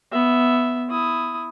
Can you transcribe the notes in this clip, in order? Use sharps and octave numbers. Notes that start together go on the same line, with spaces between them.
B3 E5
E4 D#6